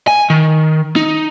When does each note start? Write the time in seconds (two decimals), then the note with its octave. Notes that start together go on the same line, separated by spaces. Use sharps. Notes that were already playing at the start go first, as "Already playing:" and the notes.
0.07 G#5
0.30 D#3
0.96 D#4